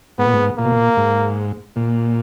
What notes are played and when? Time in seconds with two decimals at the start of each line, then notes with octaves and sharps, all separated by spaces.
0.19 G#2 B3
0.26 A#2
0.33 G#2
0.57 A#2 A#3
0.65 B2
0.72 A#2
0.97 G#2
1.76 A#2